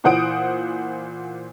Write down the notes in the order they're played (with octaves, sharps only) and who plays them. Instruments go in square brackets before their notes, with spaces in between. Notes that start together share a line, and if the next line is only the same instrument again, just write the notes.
[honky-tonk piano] A#2 E3 C5 F#5 D#6 D7